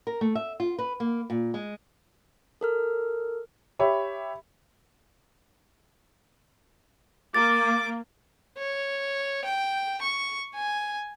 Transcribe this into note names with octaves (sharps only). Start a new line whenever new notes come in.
A#4
A3
E5
F4
B4
A#3
A#2
G#3
A4 A#4 F6
G4 C#5 E5 B5
A#3 D6 A6
C#5
G5
C#6
G#5